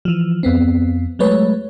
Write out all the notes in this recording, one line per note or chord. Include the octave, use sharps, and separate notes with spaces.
E3 F3
F2 B3 C4
F#3 G#3 A3 B4 C#5